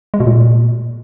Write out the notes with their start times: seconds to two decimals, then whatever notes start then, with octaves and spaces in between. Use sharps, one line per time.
0.14 G#3
0.20 B2
0.27 A#2